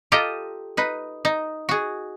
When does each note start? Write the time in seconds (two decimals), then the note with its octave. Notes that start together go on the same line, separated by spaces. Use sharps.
0.12 F4 G4 A4 D#5 A#5
0.77 D#4 B4
1.25 D#4
1.69 F#4 G#4